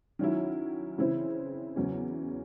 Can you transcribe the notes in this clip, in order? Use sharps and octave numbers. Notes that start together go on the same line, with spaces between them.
D#3 F#3 C#4 E4
C#3 E3 C4 E4
E2 C#3 F#3 C#4